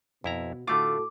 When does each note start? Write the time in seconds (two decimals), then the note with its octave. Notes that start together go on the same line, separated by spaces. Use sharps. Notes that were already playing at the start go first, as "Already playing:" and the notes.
0.24 F2 B2 B3 E4 A#5
0.68 A2 D3 A3 F4 F#4 A4 D6